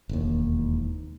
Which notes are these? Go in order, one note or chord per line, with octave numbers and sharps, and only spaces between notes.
E1 D#2